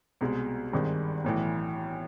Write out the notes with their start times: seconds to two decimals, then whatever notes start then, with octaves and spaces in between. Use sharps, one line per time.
0.21 C2 B2 G#3
0.73 G#1 G2 D#3 G#3
1.24 B1 A2 E3